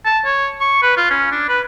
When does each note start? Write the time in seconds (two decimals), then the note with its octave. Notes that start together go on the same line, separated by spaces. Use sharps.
0.05 A5
0.25 C#5
0.61 C#6
0.82 B4
0.97 F4
1.10 C#4
1.32 D4
1.49 B4